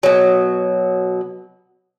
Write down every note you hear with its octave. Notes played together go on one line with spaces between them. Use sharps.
B2 F#3